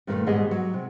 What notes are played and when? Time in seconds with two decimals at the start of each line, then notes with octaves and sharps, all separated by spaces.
0.07 G2 A#2 D#3 G3 A3
0.26 D#2 G#2 G3 B3 G#4 D#5
0.51 F#3
0.74 C3